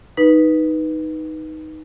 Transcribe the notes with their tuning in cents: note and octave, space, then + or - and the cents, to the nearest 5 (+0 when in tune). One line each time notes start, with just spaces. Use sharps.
D#4 +5 B4 -10